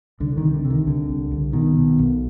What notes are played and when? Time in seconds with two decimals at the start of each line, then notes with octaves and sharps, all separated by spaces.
0.20 C2 D3
0.37 D#3
0.42 C3
0.54 D3
0.65 C3
0.70 D#3
0.87 C2 D3
1.09 C2
1.31 C2
1.53 B2 D#3
1.76 B2
1.98 B1